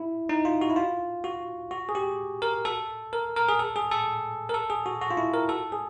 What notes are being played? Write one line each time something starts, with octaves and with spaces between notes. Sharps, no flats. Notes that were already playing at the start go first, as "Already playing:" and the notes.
Already playing: E4
D#4
F4
F#4
E4
F4
F#4
F#4
G#4
G4
A#4
A4
A#4
A#4
G#4
A4
G#4
A4
A#4
A4
G#4
F#4
F#4
F4
E4
A#4
A4
G#4